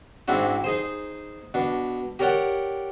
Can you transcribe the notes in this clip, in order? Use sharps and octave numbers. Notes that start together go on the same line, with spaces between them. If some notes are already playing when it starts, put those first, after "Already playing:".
G#2 C4 D4 E4 F#4
D#4 G#4 C5
B2 D4
G4 A#4 C#5 D5 F#5 G5